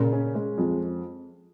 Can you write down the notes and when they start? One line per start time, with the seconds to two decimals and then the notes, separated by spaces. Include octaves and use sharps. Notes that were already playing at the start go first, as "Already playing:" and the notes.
Already playing: A#2 C#3
0.13 C#4
0.35 G#3
0.58 F2